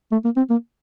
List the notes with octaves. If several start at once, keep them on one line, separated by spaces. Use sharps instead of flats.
A3
A#3
C4
A#3